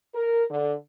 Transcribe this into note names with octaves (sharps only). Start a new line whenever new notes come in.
A#4
D3